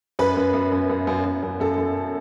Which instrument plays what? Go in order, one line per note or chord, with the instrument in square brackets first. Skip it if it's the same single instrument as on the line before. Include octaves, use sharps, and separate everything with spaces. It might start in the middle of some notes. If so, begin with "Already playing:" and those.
[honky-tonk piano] F#2 B4
F#2
F#2
F#2
F#2
F#2
F#2
F#2
F#2 A4
F#2